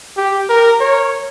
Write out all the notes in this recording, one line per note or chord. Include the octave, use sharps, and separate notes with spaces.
G4
A#4
C#5